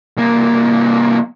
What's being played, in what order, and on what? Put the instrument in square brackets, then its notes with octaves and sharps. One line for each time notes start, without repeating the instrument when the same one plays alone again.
[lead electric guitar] C2 A#3